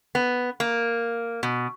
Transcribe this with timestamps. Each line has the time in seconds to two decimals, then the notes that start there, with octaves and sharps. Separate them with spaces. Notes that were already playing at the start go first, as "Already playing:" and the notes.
0.15 B3
0.60 A#3
1.43 B2